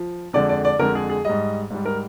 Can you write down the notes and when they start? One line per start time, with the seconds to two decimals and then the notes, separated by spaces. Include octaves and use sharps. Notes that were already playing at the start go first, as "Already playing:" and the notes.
Already playing: F3
0.33 F2 D3 G#3 D5
0.49 D5
0.65 D5
0.79 F2 D3 G#3 A#4
0.95 G#4
1.10 G#4
1.25 G#2 G3 D#5
1.70 G#2 G3
1.85 A#4